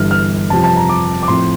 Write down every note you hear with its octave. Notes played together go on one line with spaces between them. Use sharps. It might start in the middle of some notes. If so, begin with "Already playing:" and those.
Already playing: G1 G2 E3 F6
F6
F2 C3 G3 C4 F4 A5
A5
A#5
D6
D6
A2 F3 C4 F4 C6